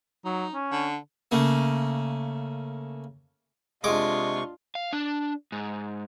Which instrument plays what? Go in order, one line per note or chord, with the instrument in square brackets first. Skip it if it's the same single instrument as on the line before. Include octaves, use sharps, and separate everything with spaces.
[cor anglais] F#3 [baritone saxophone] D#4
[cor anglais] C#4
[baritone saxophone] D3
[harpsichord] C#3 A3 A#3
[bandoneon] C3 C#6 [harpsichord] G#3 D6 [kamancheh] D4 D#5 [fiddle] F4
[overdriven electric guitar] F5
D4
G#2